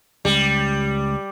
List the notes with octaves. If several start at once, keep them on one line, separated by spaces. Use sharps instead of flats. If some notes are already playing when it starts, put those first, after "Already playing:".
C#2 G3